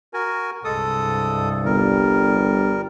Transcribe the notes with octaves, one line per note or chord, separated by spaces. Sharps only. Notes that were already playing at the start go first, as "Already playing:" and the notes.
F#4 A#4 G#5
C2 G2 G#3 A4 D#6
G1 G3 A#4